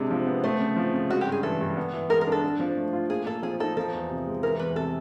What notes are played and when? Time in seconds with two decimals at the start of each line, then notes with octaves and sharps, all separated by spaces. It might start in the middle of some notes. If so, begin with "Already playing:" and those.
Already playing: C3 G#3 D4
0.11 F3
0.27 B3
0.44 A3 C5
0.60 C#3
0.77 F3
0.94 C#3
1.10 G#3 F#4
1.21 G4
1.27 G2
1.32 G#4
1.43 E3 A4
1.61 G2
1.77 B3
1.93 E3
2.10 G#3 A#4
2.21 A#4
2.27 D4
2.32 A4
2.43 D4
2.60 F3
2.77 A3
2.93 F4
3.10 A#3 G#4
3.27 A#2 A4
3.43 F3 G#4
3.60 D#4 A4
3.77 F3 A4
3.93 E2
4.10 C3
4.26 G#3
4.43 E3 A#4
4.59 E2 B4
4.76 C3 A4